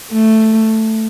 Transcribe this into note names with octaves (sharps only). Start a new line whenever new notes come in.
A3